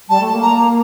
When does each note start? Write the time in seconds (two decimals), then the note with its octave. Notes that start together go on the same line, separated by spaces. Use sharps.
0.09 G3 A5
0.20 A3
0.32 A#3
0.42 A#5